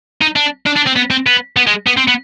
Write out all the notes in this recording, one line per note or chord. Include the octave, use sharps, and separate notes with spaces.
D#4
D4
D4
D4
C4
B3
C4
B3
B3
G#3
B3
C4
B3